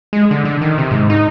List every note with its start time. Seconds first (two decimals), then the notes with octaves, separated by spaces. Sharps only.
0.13 G#3
0.31 D3
0.45 D3
0.61 D#3
0.78 C3
0.91 G#2
1.10 D#4